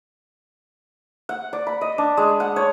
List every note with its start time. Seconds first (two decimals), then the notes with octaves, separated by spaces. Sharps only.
1.29 F#5
1.53 D5
1.67 B5
1.81 D#5
1.98 D4
2.17 G#3
2.40 F#5
2.56 C#5